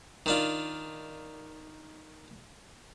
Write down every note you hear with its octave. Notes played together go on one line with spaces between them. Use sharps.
D#3 D4 F4